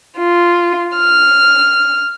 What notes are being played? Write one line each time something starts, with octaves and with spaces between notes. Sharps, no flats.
F4
F6